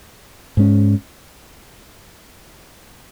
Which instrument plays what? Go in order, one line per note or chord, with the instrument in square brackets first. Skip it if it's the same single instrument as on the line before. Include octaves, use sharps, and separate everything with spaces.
[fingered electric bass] G#2 G#3 C#4